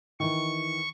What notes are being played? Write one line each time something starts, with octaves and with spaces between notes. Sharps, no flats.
D#3 E3 C#6